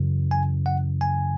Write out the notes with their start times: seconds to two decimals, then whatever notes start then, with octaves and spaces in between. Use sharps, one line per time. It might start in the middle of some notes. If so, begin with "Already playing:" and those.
Already playing: F#2 C#3 E3
0.31 G#5
0.66 F#5
1.01 G#5